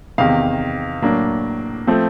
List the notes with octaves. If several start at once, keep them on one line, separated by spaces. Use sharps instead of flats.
E2 C3 D#3 F5
A2 F#3 A#3 D4
F3 A3 C4